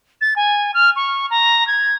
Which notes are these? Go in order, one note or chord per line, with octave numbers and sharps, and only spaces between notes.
A6
G#5
F6
C#6
A#5
G#6